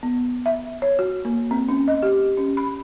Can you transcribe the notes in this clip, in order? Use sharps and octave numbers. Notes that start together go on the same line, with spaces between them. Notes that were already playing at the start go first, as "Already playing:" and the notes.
B3
E5
C#5
F#4
A#3
C4
C#4
D#5
G4
C#4
B5